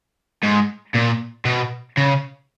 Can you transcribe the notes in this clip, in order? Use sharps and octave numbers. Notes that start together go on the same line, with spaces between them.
G#2
A#2
B2
C#3